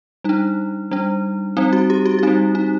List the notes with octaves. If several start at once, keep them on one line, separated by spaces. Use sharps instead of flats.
G3 D4 D#4
G3 D4
G3 C4 D#4
F#4
G4
F#4
F#4
G3 C4 D#4
D#4